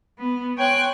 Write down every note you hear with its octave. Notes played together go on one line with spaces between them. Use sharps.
B3
C#5 G5 G#5 C6 F#6